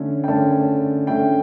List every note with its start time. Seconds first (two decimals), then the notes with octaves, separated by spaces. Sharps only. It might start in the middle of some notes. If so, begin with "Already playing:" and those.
Already playing: D3 A3 C#4
0.24 G5
0.28 D3 A3 C#4 A5
1.07 D3 A3 C#4 G5